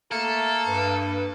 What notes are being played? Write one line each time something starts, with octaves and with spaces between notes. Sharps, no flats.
A3 A#3 A4
G2 B4